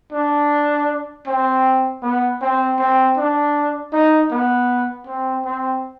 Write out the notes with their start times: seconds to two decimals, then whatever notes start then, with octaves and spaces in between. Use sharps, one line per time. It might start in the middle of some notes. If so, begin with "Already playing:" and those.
0.12 D4
1.27 C4
2.02 B3
2.41 C4
2.79 C4
3.17 D4
3.93 D#4
4.31 B3
5.07 C4
5.45 C4